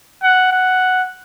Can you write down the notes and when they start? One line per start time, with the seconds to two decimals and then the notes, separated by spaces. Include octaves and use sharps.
0.23 F#5
0.52 F#5